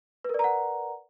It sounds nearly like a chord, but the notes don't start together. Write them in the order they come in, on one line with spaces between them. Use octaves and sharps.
B4 A#4 D5 A#5 F#5